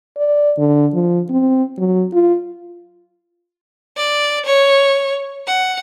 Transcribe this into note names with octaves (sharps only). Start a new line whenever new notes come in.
D5
D3
F3
C4
F#3
F4
D5
C#5
F#5